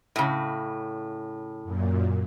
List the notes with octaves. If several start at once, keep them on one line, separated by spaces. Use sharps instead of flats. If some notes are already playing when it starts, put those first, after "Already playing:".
A2 C#3
F#2 A#2